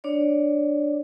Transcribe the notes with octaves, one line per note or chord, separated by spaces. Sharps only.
D4 C#5 D5